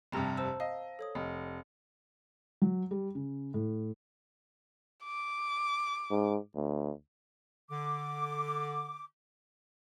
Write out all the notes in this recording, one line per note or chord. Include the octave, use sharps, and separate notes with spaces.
F1 G2 C3 A5 A#5 E6
C5 A5 E6
D#5 F5
A4 C#5 D#6
F1 D#5
F#3
G3
C#3
A2
D6
G#2
D2
D3 D6